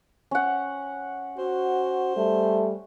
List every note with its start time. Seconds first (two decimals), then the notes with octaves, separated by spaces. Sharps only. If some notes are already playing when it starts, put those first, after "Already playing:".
0.31 C#4 F#5
1.38 F#4 C5
2.17 G3 A3